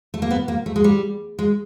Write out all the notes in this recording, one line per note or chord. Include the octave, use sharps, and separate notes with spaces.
A3
A#3
B3
A#3
A3
G#3
G3
G#3